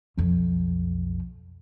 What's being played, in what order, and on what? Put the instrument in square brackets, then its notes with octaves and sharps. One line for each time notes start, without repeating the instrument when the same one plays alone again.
[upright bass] B1 F2